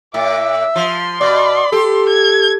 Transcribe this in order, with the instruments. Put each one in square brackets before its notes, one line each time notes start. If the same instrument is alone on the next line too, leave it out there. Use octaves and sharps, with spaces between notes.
[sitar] A2 [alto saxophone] E5 [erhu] D6
[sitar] F3 [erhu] C6
[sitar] B2 [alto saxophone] D5
[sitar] G4 [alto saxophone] A4
[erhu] G#6